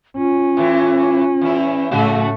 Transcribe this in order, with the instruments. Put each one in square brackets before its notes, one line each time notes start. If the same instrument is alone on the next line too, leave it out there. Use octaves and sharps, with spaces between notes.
[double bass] C#4 [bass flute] F4
[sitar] A2 E3
E2 E4
[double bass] A2 A3 [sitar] C#3 F#4